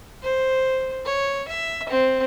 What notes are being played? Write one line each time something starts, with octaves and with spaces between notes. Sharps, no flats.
C5
C#5
E5
C4